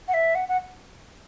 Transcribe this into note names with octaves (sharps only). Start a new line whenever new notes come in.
F#5
E5
F#5
F#5